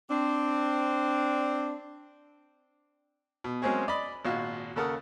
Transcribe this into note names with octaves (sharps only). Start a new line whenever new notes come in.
C4 D4
B2
F#3 G#3 A#3 C4 C#4 G#4
D5 D#5 B5
G#1 A#2 F#4 F5
D#2 C#3 A4 A#4 F#5 D#6